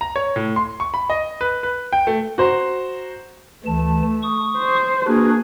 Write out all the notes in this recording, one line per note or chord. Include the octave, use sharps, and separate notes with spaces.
A#5
C#5
A2
C6
C#6
B5
D#5
B4
B4
G5
A3
F#4 C5 A#5
D2 E3 A3 A5
C#6 D#6
C5
A#3 D4 F#4 G#4 B4